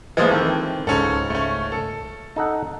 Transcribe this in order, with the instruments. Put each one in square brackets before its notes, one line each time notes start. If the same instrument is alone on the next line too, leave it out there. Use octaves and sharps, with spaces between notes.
[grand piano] E3 F3 G#3 [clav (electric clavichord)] A#3 C5 D#5
[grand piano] D#3 [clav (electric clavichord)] E3 C4 A4
[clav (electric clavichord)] C#2 G#2 [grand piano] C#4 A4
[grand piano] A3 C#4
A4
[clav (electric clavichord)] D#4 A4 F#5